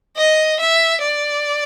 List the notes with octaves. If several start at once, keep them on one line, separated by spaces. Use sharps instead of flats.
D#5
E5
D5